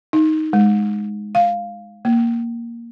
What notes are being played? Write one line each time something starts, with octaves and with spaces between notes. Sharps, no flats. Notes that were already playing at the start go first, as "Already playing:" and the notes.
D#4
G#3
F5
A#3